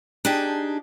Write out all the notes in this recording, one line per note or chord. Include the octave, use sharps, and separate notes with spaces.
D4 D#4 G4 G#4 A5